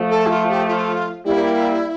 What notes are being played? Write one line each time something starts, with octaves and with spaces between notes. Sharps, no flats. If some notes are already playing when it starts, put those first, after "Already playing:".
Already playing: F3 A3
A4
E4
F4
G4
F4
G3 A#3 E4